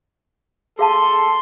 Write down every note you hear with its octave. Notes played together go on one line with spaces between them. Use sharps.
G#4 A4 F5 A5 C6